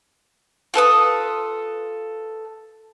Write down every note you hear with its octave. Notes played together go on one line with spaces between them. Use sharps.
F4 A4 B4 D#6